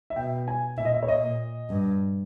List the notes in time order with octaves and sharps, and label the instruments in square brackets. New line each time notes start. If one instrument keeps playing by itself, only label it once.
[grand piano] E5
[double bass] B2 [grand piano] G5
[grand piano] G#5
[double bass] A#2 [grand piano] E5
[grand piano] D#5
E5
C#5
[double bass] A#2 [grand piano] D#5
[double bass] G2